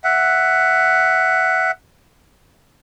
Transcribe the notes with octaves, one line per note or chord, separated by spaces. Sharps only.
E5 F#5